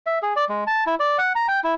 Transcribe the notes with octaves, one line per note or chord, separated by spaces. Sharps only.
E5
G#4
D5
G#3
A5
E4
D5
F#5
A#5
G5
E4